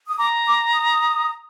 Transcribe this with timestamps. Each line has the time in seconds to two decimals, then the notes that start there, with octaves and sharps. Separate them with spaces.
0.08 D#6
0.18 A#5 D6
0.46 D6
0.73 D#6